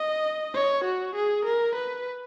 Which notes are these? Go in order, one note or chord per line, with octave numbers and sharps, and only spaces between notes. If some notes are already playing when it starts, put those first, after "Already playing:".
Already playing: D#5
C#5
F#4
G#4
A#4
B4